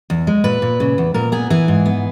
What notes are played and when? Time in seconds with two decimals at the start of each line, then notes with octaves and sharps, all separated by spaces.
0.10 E2
0.27 G#3
0.44 A#2 B4
0.62 A#2
0.80 C#3
0.98 E2
1.14 A#2 A#4
1.32 B3 G#4
1.50 E3 G#4
1.68 G#2
1.86 B3